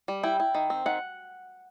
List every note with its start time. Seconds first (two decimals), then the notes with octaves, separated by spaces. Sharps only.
0.08 G3
0.23 E4 G5
0.40 E4
0.55 D#3
0.70 C4
0.86 D#3 F#5